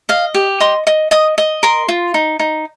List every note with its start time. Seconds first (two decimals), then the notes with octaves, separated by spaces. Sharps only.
0.09 D#5 F5
0.34 G4
0.60 D#5 C6
0.87 D#5
1.11 D#5 D#6
1.38 D#5
1.63 A#4 C6
1.89 F4
2.14 D#4
2.39 D#4